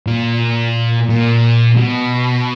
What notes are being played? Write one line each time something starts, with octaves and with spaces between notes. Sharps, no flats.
A#2
A#2
B2